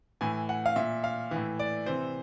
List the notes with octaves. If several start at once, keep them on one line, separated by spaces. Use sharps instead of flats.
A2 E3 G#5
F#5
F5
A#2 E5
F5
A2 E3
D5
C3 E3 C5